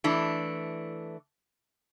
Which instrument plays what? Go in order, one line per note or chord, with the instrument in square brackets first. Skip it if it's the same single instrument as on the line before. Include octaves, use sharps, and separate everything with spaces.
[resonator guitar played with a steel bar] E3 A3 D4